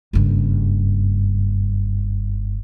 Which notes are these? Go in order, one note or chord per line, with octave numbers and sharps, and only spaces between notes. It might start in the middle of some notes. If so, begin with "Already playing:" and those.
F#1 G2